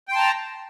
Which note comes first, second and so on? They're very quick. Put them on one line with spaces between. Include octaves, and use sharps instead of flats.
G5 C6 A5 A#5